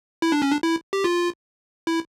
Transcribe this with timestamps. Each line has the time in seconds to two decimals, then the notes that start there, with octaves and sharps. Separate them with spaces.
0.22 E4
0.32 D4
0.42 C#4
0.52 D4
0.63 E4
0.93 G4
1.04 F4
1.87 E4